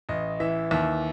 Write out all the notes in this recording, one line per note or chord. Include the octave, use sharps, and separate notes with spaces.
A1 D#5
E3 E5
D#2 E5